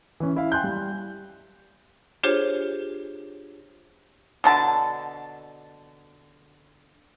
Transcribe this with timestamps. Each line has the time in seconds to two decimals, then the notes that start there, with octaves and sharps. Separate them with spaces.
0.20 E3 C#4
0.36 E4 F5
0.52 G5 G#5 C6 F#6 G6
0.64 G3
2.24 D4 F4 G4 G#4 C5 C#5
4.44 B2 D3 A5